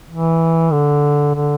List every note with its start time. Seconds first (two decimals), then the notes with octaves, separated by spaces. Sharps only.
0.11 E3
0.72 D3
1.35 D3